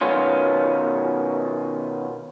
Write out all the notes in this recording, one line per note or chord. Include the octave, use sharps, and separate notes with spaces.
B2 D#3 B3 C#4 F4